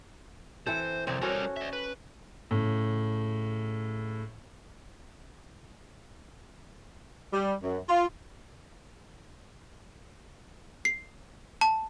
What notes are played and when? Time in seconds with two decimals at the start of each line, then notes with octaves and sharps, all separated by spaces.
0.67 E3 C4 A4 C5
1.07 C2 F2 C4 D5
1.22 G3 C#4 F#4 A4 A#4
1.56 D5 E5
1.73 B4
2.51 A2 C#3
7.33 G3
7.63 F#2
7.89 F4
10.85 C7
11.61 A5